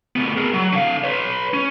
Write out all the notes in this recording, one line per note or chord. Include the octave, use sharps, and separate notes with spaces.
D2 B3
G#4 A#4
F#3
D3 F5
B4 C#5
C#4